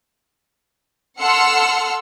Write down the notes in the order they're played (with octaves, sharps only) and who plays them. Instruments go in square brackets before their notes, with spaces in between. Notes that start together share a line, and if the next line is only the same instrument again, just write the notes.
[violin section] A4 F#5 C6 E6 F6 C#7